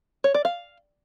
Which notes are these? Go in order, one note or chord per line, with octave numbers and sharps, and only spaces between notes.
C#5
D5
F5